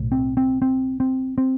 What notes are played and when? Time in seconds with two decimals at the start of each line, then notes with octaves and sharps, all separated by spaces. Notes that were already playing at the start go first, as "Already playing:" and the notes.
Already playing: B1 A2
0.12 C4
0.37 C4
0.62 C4
1.00 C4
1.38 C4